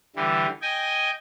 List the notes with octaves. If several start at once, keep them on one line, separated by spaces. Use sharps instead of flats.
D3 E3 G3
D#5 G5 G#5